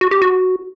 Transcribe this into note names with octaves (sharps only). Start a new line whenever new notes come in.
F#4
G4
F#4